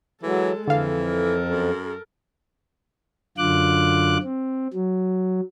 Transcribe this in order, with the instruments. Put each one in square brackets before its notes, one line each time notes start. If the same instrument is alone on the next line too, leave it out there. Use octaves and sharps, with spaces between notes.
[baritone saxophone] E3 [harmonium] F#3 [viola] G#3 A4
[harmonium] F2 [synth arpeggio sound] D3 F5 [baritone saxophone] E3 [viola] A4
[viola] A4 A#4
[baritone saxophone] F#2
[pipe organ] F#2 D3 F4 D6 F#6
C4
F#3